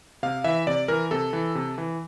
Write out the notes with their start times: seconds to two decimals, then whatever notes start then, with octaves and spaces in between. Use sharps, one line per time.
0.23 C3 F5
0.44 E3 E5
0.67 C3 D5
0.88 E3 A#4
1.11 C3 A4
1.33 E3
1.55 C3
1.78 E3